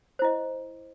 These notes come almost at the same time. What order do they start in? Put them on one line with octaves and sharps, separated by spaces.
C5 E4 D#5